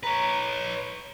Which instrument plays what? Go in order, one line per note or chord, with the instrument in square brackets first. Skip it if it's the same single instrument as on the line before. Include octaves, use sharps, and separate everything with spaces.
[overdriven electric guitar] B4 C#5 [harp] A#5